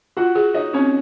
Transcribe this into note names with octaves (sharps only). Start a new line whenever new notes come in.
F4 F#4 F#5
G#4
D#4 C#5 D#5
C4 C#4 C#5